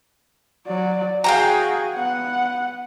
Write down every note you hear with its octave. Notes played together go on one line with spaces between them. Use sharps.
F#3 D5
F#4 G#4 F5 G5 A#5
B3 F#5